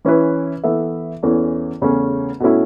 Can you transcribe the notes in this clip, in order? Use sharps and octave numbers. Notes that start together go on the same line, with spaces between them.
E3 C#4 E4 B4
E3 B3 A4 E5
E2 E3 C#4 A4
E2 C#3 A3 C#4
B2 A3 C#4 E4